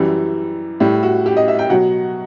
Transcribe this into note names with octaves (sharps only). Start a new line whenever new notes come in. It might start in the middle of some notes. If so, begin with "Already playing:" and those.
Already playing: F#2 E3 G3
A2 G3 E4
F#4
G4
D#5
E5
G5
B2 F#3 F#5